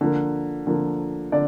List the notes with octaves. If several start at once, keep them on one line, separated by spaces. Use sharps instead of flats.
D3 F3 A#3
D3 F3 A#3
D3 D5